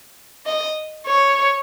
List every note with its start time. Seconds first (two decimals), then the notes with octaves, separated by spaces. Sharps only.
0.46 D#5
1.07 C#5